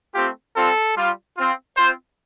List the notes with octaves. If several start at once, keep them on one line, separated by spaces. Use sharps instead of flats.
A3 C4 F4 G4
G3 C4 F4 A4
G3 F4
C4 F4
C4 F4 C5